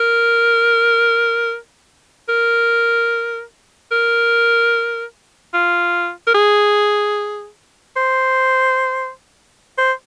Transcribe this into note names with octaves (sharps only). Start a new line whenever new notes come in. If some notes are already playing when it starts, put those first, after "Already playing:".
Already playing: A#4
A#4
A#4
F4
A#4
G#4
C5
C5